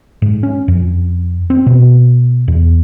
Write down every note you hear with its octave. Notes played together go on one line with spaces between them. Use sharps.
G#2
C#4
F2
C4
B2
E2